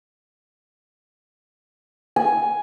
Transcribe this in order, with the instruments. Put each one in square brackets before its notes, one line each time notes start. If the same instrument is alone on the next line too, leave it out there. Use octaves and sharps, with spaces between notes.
[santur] G#5